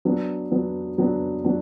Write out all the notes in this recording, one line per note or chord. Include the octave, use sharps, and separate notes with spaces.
F#3 B3 D4
F#3 B3 D4
F#3 B3 D4
F#3 B3 D4